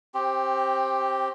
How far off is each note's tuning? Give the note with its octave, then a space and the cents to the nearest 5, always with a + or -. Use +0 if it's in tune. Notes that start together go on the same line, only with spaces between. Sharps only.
C4 +20 G4 +0